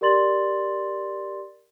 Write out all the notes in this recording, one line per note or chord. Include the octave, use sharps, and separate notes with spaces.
G4 A#4 D5 C6 A6 F#7